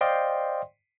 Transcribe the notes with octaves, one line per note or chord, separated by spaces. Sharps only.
C5 D5 D#5 F5 G5 C6